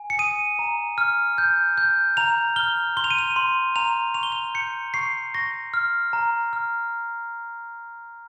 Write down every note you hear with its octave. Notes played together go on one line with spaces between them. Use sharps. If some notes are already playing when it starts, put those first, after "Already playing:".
Already playing: G#5
C#7
D#6 D#7
A#5
F6
G6
G6
A#5 F7
F6 G7
C6 G7
F7
D#7
F7
C6
A#5 F7
C#6 F7
G7
F7
G6 C#7
C#6 C7
C#6 A#6
F6
A#5
F6